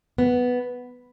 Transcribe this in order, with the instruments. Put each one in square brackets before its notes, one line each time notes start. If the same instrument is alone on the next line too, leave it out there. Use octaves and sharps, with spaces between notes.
[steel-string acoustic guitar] B3